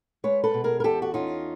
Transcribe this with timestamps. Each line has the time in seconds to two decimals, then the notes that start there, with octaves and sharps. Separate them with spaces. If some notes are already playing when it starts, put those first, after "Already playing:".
0.24 G#3 B4 C#5
0.44 A4 B4
0.54 B2
0.64 G#4 A#4
0.80 A#4
0.84 E2 G4 A4
1.02 F#4
1.14 C#4 D#4 F4